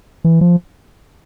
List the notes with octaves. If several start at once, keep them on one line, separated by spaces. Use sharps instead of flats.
E3
F3